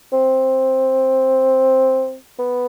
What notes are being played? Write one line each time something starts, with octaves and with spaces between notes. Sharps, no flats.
C4
B3